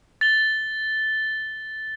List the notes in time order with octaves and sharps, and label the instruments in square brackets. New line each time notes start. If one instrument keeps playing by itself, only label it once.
[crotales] A6 G7